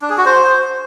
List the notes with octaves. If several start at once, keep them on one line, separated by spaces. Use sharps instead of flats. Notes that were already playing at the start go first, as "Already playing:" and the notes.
D4
G#4
F#4
C5